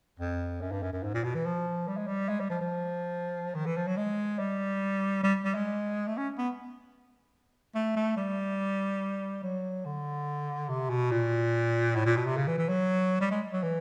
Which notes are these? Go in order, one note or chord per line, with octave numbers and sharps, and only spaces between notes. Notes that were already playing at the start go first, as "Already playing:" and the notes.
F2
F#2
G2
F#2
F#2
G#2
A#2
B2
E3
F3
G3
G#3
G3
G#3
G3
F3
F3
D#3
E3
F3
F#3
G#3
G3
G3
G3
G#3
A3
C#4
B3
A3
A3
G3
F#3
D3
C3
B2
A#2
A2
A#2
B2
C3
C#3
E3
E3
F#3
G3
G#3
F#3
E3